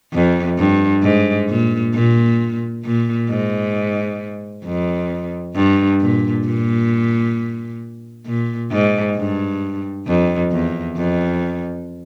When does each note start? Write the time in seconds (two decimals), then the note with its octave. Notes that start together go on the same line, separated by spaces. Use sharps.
0.13 F2
0.58 G2
1.03 G#2
1.49 A#2
1.94 A#2
2.85 A#2
3.29 G#2
4.65 F2
5.55 G2
6.00 A#2
6.46 A#2
8.26 A#2
8.71 G#2
9.16 G2
10.07 F2
10.52 E2
10.97 F2